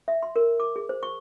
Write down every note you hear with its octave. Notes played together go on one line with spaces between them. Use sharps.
E5
C6
A#4
D6
G#4
C5
C#6